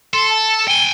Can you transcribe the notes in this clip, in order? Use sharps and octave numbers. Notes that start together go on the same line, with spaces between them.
A4 C6
A5
G5 G#5 G7